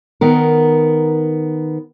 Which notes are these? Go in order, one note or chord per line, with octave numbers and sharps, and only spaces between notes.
D#3 B3 A#4